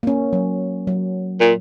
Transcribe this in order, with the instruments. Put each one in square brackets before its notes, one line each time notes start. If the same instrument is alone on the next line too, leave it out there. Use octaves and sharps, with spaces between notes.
[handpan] A#3 C#4
F#3
F#3
[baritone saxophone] A#2